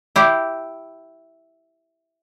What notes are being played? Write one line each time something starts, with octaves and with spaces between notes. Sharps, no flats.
E4 G4